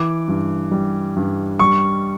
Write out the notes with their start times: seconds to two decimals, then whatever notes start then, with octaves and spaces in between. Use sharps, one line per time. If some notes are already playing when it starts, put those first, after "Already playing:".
Already playing: E3 D6
0.28 G2
0.71 G3
1.16 G2
1.59 G3 C#6